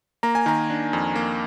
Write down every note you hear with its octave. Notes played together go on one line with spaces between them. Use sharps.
A#3 A#5
G#5
D#3 A#5
D4
F2
A#3